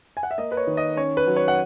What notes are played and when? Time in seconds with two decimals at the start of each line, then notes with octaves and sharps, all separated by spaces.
0.17 G#5
0.23 F#5
0.31 E5
0.38 A#3 D#5
0.52 B4
0.57 C#5
0.67 D#3
0.77 D#5
0.97 C#4 C#5
1.17 B4
1.27 F#3
1.36 C#5
1.48 F#5